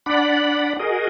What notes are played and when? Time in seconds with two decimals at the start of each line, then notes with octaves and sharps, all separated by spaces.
0.06 D4 D5 F#5 B5
0.79 F#4 G#4 A#4 D#5